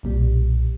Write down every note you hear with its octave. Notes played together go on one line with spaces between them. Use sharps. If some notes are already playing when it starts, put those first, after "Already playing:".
B1 A#2 G3